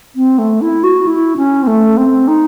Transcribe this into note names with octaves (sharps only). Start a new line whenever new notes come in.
C4
A3
E4
F#4
E4
C#4
C4
A3
C4
D#4